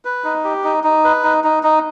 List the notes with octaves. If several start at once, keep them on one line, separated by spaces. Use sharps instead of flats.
B4
D#4
G4
D#4
D#4
B4
D#4
D#4
D#4